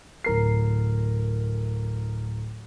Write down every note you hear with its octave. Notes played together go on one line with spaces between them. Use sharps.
D1 A#4 C7